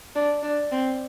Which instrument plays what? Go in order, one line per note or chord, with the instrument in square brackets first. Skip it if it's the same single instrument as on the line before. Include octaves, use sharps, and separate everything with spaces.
[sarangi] D4
D4
C4